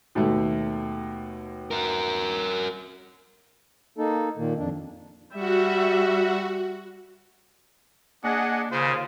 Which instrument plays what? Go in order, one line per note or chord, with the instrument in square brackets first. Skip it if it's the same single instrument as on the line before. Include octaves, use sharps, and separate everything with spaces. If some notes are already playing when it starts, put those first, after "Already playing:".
[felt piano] D#2 B2 A3
[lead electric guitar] F#4 A#4
[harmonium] A#3 D#4 A4
A#2 D#3 A#3
F2 D4
[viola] G3 E5 [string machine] F#4
[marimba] A#3 [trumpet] D4 [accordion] G#4 D#5 F#5
[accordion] D#2 F4 [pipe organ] C#3 [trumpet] C5